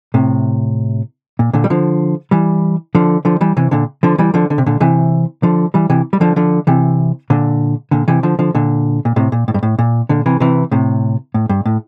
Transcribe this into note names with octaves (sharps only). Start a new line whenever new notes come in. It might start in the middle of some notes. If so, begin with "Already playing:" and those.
A2 C3
A#2
A#2 D3
G3
D3 F3
E3 G3
D3 F3
D3 F3
E3 G3
C3 E3
A#2 D3
D3 F3
E3 G3
D3 F3
D3
C3
A#2 D3
C3 E3
D3 F3
E3 G3
C3 E3
G3
D3 F3
D3 F3
C3 E3
A#2 D3
A#2 D3
C3 E3
D3 F3
D3 F3
A#2 D3
A#2
A2 C3
A#2
A2
G2
A2
A#2
A#2 D3
C3 E3
C3 E3
A2 C3
A2
G2
A2